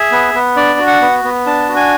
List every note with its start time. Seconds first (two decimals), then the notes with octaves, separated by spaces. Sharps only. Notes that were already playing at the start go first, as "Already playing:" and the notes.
Already playing: G#4 E5
0.12 B3
0.34 B3
0.57 D4 D5
0.79 F#4
0.87 F#5
1.02 B3
1.24 B3
1.46 D4 A5
1.69 F#4
1.76 G#5